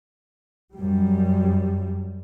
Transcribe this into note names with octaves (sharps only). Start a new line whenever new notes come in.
F#2 G3